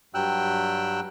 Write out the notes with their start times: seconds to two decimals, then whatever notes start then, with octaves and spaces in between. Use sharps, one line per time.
0.14 G2 F#3 G3 G5 E6 F#6